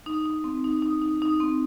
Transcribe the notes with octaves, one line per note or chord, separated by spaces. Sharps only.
D#4
D#4
C4
D#4
D#4
D#4
D#4
C4